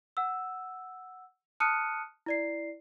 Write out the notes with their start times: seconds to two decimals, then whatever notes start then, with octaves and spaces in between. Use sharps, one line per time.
0.17 F#5 E6
1.60 A5 D#6 F6 F#6 C#7 D#7
2.26 E4 D5 C7